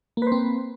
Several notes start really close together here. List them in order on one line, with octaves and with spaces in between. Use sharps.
A#3 B4 C5 C4